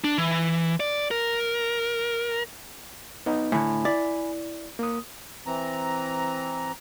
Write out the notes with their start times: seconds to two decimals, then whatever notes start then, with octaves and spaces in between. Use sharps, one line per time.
0.04 D4
0.18 E3
0.80 D5
1.11 A#4
3.26 B3 D#4
3.52 A2 D3 G#5 B5
3.85 E4 D5
4.79 A#3 D#6
5.46 E3 C4 A#5